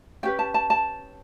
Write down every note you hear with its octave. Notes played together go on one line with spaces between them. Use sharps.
C#4 G4 B4 G5
A5
A5
A5